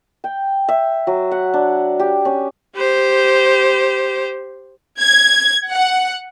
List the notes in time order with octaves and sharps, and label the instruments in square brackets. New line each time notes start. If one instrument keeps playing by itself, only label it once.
[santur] G5
E5
F#3
F#5
D4
G4
C#4
[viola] G4 C5
[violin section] G#6
F#5